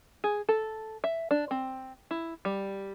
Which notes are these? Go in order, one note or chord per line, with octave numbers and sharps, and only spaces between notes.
G#4
A4
E5
D4
C4
E4
G3